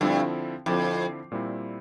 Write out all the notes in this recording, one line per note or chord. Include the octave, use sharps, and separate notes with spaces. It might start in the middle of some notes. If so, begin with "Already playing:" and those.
G2 D3 F3 C4 E4
F2 D3 F3 C4 E4
A#2 G3 C4 E4